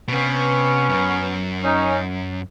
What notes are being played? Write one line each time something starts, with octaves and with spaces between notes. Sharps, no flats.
B2
C3 B3 C#4
F#2
C#4 D#4